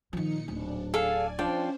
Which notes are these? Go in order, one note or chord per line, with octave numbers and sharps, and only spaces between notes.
A#2 D#3 F3 D#4 C#7
D1 D4
G#4 A4 D5 F5 G#5
F3 C#4 D4 C5 D5 G5